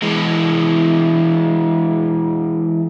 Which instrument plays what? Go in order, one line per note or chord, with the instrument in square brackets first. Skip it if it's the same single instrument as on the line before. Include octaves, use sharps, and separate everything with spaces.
[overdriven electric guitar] E3 G#3